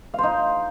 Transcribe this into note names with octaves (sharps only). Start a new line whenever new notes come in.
D#4 C5 F5